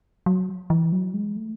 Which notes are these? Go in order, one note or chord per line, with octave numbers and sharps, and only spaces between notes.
F#3
E3
F#3
G#3
A3